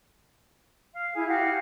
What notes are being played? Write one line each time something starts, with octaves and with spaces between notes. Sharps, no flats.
F5
E4 G#4
F#4 G4 F5